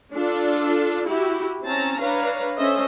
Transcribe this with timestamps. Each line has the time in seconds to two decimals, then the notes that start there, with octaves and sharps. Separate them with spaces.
0.13 D4 F4 A4
1.07 E4 F#4 G4
1.63 C4 C#4 A5 A#5
2.01 D4 B4 C#5 F5 A#5
2.57 C#4 A4 C5 D#5 E5